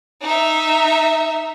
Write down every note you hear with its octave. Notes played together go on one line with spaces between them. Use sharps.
D#4 E5